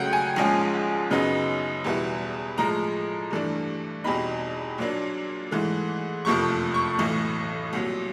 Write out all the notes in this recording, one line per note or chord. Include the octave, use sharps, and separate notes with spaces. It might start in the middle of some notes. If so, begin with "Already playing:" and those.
Already playing: C#2 C#3 F#3 A3 F#5 G5
G#5
A#1 G#2 F3 G#3 C#4
F#2 C#3 F#3 B3 D#4
E2 B2 G3 B3 E4
A2 F3 G#3 A#5
G2 E3 A3 D4
E2 B2 G3 C4 D#4 B5
A#2 F#3 A#3 D4
G#2 E3 A3
F#1 F2 C3 F3 A3 C#6
C#6
B1 A2 E3
C2 A#2 F#3